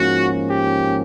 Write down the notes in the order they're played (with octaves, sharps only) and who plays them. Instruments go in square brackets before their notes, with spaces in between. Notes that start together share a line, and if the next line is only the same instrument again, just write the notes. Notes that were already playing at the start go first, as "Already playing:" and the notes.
Already playing: [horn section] G#2 F3 A#3 C#4 F#4
G4